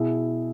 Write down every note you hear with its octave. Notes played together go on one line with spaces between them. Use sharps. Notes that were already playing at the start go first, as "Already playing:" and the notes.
Already playing: B2 E4 G#4